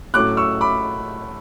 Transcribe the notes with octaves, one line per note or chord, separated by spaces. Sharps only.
A2 F#3 A3 C#4 D6 F#6
C#6 E6
B5 D6